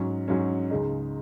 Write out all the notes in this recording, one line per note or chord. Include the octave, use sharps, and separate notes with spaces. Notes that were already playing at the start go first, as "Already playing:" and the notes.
Already playing: G#2 F#3 C#4
G#2 F#3 C#4
C#2 C#3 G#3 D#4